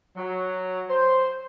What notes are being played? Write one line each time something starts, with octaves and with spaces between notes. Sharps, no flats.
F#3
C5